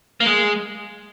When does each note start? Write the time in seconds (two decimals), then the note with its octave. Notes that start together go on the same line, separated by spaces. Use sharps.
0.20 A#3
0.26 G#3